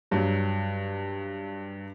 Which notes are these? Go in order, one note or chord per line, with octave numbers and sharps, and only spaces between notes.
G2 F#3